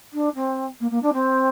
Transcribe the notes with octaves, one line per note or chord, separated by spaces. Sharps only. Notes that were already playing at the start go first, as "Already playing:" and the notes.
D4
C4
A#3
A#3
D4
C4